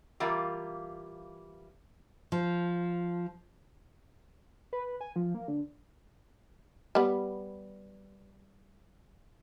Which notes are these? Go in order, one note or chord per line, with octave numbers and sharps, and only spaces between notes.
E3 G3 A#3 F4
F3
B4
G#5
F3
A#3
D3
G3 B3